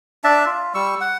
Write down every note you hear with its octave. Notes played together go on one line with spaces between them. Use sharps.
D4 E5 A5
F4
G3 C#6 E6
F#5